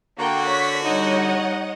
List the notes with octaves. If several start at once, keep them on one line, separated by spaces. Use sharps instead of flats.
D3 A#3 F#4 G5
C#5 B6
G3 D#4 C#5 D#5 F#5